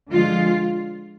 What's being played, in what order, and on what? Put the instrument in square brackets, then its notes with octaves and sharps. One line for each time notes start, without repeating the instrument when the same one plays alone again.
[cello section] D3 F3 G#3 F4